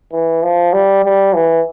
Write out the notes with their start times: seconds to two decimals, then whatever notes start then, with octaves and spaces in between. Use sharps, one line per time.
0.12 E3
0.43 F3
0.73 G3
1.04 G3
1.34 E3